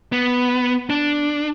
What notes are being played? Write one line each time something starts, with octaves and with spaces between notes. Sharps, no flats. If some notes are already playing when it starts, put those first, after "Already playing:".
B3
D4